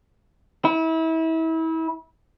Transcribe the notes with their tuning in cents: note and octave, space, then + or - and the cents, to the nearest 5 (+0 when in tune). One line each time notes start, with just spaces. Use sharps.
E4 -30